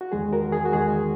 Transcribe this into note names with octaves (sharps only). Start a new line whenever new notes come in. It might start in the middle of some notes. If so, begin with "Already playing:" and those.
F#4
E2 D#3 G#3 G#4
F#4 A#4
G#4
F#4
E2 D#3 G#3 G#4